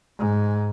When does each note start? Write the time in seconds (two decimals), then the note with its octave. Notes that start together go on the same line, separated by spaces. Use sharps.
0.19 G#2